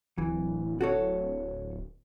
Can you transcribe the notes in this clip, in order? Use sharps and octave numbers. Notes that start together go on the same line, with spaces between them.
D1 E3
F#4 A4 C#5